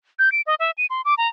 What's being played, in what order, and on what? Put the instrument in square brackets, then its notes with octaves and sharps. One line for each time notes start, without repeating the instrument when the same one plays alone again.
[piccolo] G6
D7
D#5
E5
D#7
C6
D6
A#5